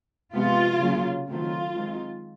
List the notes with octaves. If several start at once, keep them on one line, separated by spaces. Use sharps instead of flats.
C3 F3 G#3 B3 F4
C#3 F#3 A#3
D#3 F#3 A3 C4 F4
D#3 G#3 C4